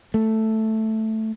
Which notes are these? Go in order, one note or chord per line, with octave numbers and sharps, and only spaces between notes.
A3